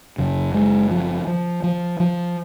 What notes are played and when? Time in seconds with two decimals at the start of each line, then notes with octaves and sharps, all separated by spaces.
0.18 F#1 F#2 C#3
0.54 G#3
0.91 F3
1.27 F3
1.64 F3
2.00 F3